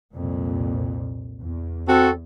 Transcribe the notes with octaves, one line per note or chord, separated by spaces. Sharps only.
C2 F2 A#2
E2
C4 F#4 A4